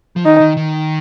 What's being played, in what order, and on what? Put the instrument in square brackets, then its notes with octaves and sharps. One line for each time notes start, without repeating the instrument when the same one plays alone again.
[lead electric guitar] F3
[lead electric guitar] D#3 [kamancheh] D#4
[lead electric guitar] D#3
D#3